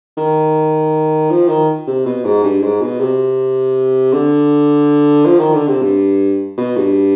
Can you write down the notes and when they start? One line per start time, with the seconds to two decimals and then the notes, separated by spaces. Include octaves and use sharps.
0.17 D#3
1.30 F3
1.48 D#3
1.87 C3
2.05 B2
2.24 G#2
2.43 G2
2.62 G#2
2.81 B2
3.00 C3
4.13 D3
5.26 F3
5.39 D#3
5.53 D3
5.68 C3
5.82 G2
6.58 B2
6.76 G2